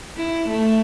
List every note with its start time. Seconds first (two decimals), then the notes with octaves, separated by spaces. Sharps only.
0.17 E4
0.48 A3